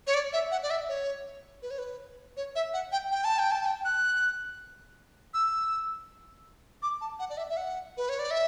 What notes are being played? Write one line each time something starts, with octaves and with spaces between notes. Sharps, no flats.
C#5
D5
E5
F#5
D5
E5
C#5
B4
C#5
B4
C#5
E5
F#5
G5
G5
A5
G5
A5
G5
F#6
E6
D6
A5
F#5
D5
E5
E5
F#5
B4
C#5
D5
E5